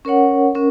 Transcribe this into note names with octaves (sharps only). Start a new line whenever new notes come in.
C#4 A#4 C#5 F#5
C#4 A#4